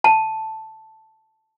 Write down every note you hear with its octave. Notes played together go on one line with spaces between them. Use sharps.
A5